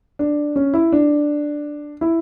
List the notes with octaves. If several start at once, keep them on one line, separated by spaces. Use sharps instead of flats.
D4
C#4
E4
D4
E4